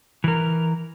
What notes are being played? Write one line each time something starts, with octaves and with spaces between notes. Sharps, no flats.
E3 A#4